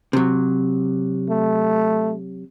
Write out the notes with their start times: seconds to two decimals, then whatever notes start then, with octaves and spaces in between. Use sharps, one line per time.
0.13 C3 F#3
1.29 A3